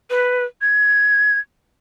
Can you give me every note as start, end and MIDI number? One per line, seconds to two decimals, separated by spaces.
0.10 0.44 71
0.61 1.39 92